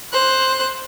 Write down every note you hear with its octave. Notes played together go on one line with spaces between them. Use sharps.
C5 F#6